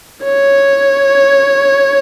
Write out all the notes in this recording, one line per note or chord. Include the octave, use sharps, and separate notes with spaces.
C#5